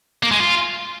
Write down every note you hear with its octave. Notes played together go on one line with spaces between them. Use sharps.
A#3
G#3
F4